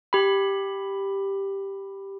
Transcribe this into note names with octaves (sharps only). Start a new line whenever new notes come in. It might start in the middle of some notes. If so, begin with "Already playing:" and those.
G4 B5